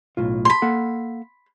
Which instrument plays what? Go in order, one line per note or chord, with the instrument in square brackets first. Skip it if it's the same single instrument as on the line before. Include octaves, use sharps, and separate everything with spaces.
[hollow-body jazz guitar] B1 A2 F4
[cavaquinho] B5 C6
[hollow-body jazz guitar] A#3 A4 F#5